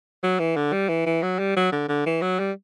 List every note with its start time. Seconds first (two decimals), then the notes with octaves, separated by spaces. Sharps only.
0.23 F#3
0.39 E3
0.56 D3
0.73 G3
0.89 E3
1.06 E3
1.23 F#3
1.39 G3
1.56 F#3
1.72 D3
1.88 D3
2.06 E3
2.22 F#3
2.39 G3